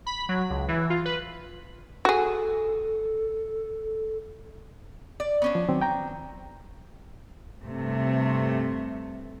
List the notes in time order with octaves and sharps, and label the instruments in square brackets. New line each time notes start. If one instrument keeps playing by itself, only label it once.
[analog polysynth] B5
F#3
C#2
E3
F4
B4
[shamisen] F#4 G#4 [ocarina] A4
[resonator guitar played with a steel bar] D5
B3 C#4 D4
[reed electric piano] F3
D#3 F#3 C4
G5 A#5
[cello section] G2 C3 A3